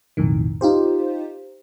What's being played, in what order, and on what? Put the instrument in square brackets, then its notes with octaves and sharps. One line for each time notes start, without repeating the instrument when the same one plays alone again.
[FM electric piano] B1 F2 A2 D#3
D#4 F4 G4 C5